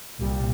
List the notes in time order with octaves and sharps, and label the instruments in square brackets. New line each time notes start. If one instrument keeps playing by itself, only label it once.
[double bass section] C2 A#2 G3